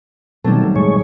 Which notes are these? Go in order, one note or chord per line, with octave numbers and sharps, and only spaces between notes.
B2 D#3 F#3 G3 A3 C4 A4
A2 G#3 C#5